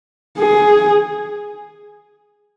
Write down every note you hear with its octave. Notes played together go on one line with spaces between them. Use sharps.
G#4